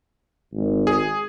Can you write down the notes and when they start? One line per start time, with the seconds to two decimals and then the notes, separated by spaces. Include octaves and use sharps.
0.54 G#1
0.87 G#4